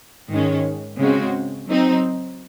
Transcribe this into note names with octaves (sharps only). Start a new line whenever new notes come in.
G#2 D#3 G#3 C#4
C#3 G#3 C4 F#4
F#3 C4 D#4